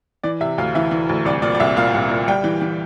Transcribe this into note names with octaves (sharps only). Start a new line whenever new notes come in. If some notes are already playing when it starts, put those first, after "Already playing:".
E3 D5
C3 E5
D2 F5
E3 E5
E3
D2
C2 D5
A#2 D5
D5
C2 E5
A#2 F5
C2
A#2
G3 G5
E3
E3